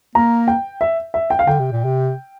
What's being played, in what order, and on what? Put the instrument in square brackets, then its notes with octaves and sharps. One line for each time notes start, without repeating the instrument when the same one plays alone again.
[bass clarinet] A#3 [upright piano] A#5
[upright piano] G5
E5
E5
G5
F5
[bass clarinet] D3 [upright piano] G5
[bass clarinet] C3
A#2
C3